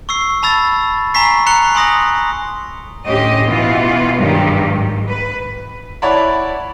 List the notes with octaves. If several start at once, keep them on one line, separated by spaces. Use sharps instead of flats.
C#6 E6 C7
A5 B5 E6 A6
G#5 A#5 C#6 B6 C7
A#5 F#6 C#7 F7 G7
G#5 C6 D#6 A#6
D2 A2 C#4 G4 C5 D#5
B2 E3 B3 F4
G2 D#3 F#3 G#3 G4
G#2
B4
E4 C#5 D5 F#5 A5 B5